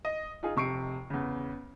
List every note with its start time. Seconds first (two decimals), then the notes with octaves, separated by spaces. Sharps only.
0.05 D#5
0.43 D#4 F4 G#4
0.56 F1 C3 C#6 C7 D7
1.10 E2 C#3